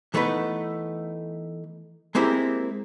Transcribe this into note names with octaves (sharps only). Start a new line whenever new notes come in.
E3 A3 B3 D#4 B4
G#3 A#3 C4 E4 G4 A#4